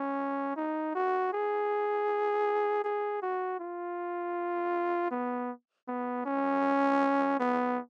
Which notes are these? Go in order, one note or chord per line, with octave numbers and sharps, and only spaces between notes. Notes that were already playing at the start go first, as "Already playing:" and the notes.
Already playing: C#4
D#4
F#4
G#4
G#4
F#4
F4
B3
B3
C#4
B3